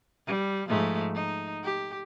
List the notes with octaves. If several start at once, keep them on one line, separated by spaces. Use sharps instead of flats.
G3
G#2 F3 A3
D#4
G4